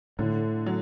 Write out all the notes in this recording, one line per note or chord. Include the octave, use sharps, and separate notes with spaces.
A2 D3
F#3